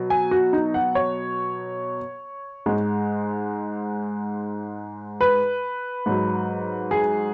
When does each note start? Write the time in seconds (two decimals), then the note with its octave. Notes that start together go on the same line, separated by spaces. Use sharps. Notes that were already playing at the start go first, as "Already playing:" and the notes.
Already playing: B2 F#3
0.10 G#5
0.31 F#4
0.53 D#4
0.74 F#5
0.95 C#5
2.66 G#2 G#3
5.21 B4
6.06 G#2 F#3
6.91 G#4